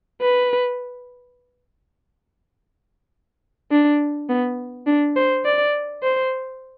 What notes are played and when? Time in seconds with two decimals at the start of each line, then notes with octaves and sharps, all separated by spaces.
0.22 B4
3.71 D4
4.29 B3
4.87 D4
5.16 C5
5.45 D5
6.03 C5